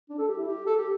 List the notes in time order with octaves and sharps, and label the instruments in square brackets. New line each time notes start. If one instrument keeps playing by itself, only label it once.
[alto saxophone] D4
A4
G4
E4
G4
A4
G4